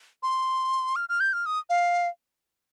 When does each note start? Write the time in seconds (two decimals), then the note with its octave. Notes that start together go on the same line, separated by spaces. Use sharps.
0.23 C6
0.96 F6
1.09 F6
1.20 G6
1.33 F6
1.46 D#6
1.69 F5